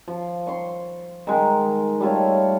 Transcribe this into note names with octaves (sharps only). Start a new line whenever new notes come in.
F3
C6 C#6
D#3 G#3 D#4 A#4
G3 A3 F4 C#5